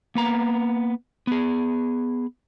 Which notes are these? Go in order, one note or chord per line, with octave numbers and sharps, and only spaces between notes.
A#3 B3 A#5
B3 G#4